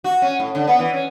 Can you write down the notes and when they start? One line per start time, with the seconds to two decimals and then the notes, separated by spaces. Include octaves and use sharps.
0.04 F#4
0.22 C#4
0.40 A2
0.55 D3
0.67 B3
0.79 E3
0.93 C#4